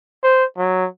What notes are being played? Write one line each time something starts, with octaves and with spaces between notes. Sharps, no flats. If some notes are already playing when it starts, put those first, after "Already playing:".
C5
F#3